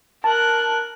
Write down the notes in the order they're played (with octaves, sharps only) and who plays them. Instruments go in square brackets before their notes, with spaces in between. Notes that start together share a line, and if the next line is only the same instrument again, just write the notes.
[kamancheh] A#4 F#6 [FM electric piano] A5